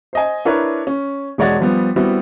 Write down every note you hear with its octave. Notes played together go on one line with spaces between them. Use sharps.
C5 D#5 G#5
D4 E4 A#4 B4 C#5
C#4
E1 G#3 C#5 D5 F#5 A6
F3 G3 B3
G3 B3 C4 E4 F#4